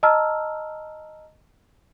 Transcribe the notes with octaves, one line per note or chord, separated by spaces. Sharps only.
D#5 A5 A#5 E6 F6